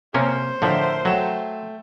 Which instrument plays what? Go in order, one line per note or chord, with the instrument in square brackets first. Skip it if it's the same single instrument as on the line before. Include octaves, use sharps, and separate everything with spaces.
[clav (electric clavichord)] C3 A#3 C#4 [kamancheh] C5
[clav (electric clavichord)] A2 D3 F3 [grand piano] A4 A#4 E5
[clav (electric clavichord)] F#3 [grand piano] A3 G5 E7